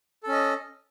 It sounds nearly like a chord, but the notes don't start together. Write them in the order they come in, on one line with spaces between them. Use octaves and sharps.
A4 C#4 D#5